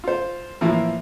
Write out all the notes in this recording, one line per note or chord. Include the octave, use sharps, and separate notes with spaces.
F4 C5
A2 E3 F3 A#3